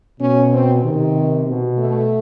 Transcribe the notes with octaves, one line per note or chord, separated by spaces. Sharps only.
B2 C#4
C4
C3 D#3
B2
A3